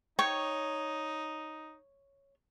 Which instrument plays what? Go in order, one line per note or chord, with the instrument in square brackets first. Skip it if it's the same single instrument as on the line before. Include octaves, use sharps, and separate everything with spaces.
[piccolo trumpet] D#4 [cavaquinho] C#5 [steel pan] G5 C#6